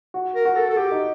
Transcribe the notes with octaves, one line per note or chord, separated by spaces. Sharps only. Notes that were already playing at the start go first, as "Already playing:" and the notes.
F#4
A#4
F#4
A4
A4
F#4 G4
D#4